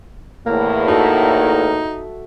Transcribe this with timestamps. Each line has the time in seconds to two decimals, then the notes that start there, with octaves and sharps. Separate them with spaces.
0.46 E2 A2 A#3
0.88 D#4 F#4 A4 E5